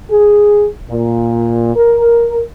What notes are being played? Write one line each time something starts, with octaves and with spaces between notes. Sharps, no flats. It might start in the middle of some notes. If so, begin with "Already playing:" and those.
G#4
A#2
A#4